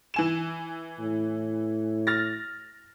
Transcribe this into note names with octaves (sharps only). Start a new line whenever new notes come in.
E3 G#5 E7
A2
F6 A6 A#6